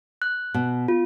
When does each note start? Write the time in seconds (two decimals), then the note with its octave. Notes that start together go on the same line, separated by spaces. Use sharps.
0.22 F#6
0.54 B2
0.88 F4